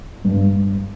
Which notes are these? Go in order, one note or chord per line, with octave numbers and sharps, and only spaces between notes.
G2